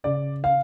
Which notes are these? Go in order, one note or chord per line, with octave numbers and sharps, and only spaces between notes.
C#3 D5
F5